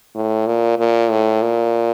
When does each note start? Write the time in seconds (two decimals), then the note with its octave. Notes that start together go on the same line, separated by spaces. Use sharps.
0.15 A2
0.47 A#2
0.79 A#2
1.11 A2
1.42 A#2